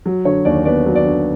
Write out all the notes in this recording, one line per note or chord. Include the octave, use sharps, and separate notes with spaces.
F#3
D3 C#5
D#2 D5
B3 D5
F#3
D5
D3